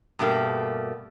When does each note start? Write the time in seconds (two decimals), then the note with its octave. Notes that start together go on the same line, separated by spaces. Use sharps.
0.19 G2 B2 A3 A#3 G4